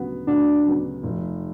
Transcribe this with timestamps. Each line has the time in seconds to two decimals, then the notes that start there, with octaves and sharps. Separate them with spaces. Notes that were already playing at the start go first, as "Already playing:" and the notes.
Already playing: D2 C#3 F#3 B3
0.27 D2 D4
0.65 C#3 F#3 B3
1.03 F1